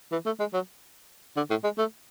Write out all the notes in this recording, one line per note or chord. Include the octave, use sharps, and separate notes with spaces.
E3
A3
G#3
F#3
D3
A2
G#3
A3